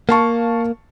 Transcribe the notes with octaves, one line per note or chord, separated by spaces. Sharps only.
A#3 F5 A5 C#6